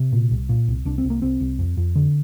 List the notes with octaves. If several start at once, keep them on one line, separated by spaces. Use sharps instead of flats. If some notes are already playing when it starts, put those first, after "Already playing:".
Already playing: C3
A#2
C2
A#2
C2
C2 D4
C4
C2
A#3
C2 C4
C2
F2
F2
D3